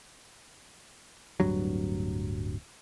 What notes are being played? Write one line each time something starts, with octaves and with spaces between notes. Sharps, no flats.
D1 G2 F#3